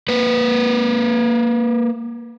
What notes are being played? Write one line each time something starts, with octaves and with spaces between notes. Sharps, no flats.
A#3 B4